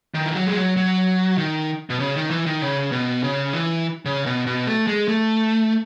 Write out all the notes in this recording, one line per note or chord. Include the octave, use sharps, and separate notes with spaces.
D#3
E3
F#3
G#3
F#3
F#3
D#3
B2
C#3
D#3
E3
D#3
C#3
B2
C#3
E3
C#3
B2
B2
A3
G#3
A3